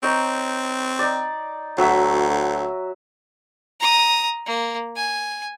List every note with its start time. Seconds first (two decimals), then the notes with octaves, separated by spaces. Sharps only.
0.03 C4 D#4 C#5
0.99 D#4 D5
1.78 D2 F#3 E5 A#5
3.80 A#5 D#6
4.46 A#3
4.96 G#5